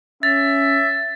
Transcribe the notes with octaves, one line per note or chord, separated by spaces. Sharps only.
C#4 E5 A6